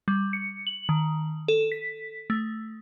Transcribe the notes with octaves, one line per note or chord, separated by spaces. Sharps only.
G3
C#7
F#7
D#3
A4
B6
A3